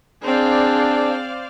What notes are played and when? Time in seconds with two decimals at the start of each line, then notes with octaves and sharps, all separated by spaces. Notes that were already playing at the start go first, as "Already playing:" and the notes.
0.24 C4 D4 G#4 C5 D5 F5